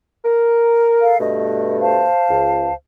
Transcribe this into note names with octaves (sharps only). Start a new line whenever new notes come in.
A#4
A4 F5
G2 B2 A3 D#5
C5 F5 A5
C#2